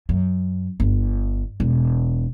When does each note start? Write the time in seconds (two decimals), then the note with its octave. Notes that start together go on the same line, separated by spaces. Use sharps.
0.09 F#2
0.80 G1
1.60 E1